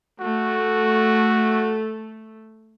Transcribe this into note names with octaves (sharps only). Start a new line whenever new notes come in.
A3 F#4